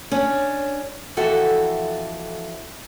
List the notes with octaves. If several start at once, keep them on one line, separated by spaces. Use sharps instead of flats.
C#4 D4
F2 E3 F#4 A4 E5